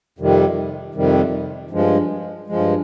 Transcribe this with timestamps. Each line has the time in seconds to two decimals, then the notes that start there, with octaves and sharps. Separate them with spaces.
0.18 F2 C3 D#3 G3
0.94 F2 C3 D#3 G3
1.71 G2 F3 G#3
2.48 G2 F3 G#3